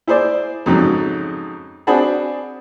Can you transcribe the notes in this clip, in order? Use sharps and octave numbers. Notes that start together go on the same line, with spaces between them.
E4 G#4 C5 D5
F2 G#2 C#3 F#3
C4 D4 F#4 G#4 A5 B5